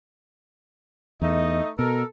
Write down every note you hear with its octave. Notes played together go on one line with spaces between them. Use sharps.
E2 A3 D#4 D#5
B2 A4 A#4